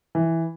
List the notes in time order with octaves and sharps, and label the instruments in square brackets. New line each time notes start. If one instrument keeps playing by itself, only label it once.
[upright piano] E3